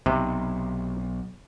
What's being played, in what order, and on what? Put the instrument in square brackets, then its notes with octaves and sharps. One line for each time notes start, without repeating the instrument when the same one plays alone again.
[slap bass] B1 [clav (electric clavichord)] C3